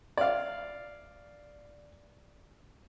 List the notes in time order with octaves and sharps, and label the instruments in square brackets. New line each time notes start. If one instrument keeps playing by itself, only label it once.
[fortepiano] D5 F5